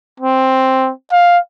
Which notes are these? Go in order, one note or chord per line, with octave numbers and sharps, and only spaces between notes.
C4
F5